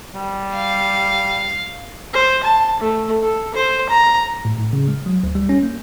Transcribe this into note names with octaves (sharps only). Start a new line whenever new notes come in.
G3
F5
C5
A5
A3
A4
C5
A#5
A2
A2
C#3
G#3
F#3
D2
G3
C#4
A#3